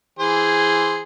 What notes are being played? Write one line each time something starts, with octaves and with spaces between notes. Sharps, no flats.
E3 G#4 C5